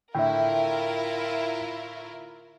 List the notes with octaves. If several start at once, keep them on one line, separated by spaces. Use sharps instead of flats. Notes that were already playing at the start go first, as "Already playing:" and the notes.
A2 D3 E4 F4 A#4 E5 G5